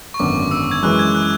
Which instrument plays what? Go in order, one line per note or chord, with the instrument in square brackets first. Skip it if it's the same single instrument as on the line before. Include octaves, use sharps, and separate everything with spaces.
[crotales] C#6
[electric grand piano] G#1 F#2 D3 F#3 B3 [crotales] D6
[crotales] E6
G#6
[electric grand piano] F#2 E3 G#3 [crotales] F#6
[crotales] G#6
F#6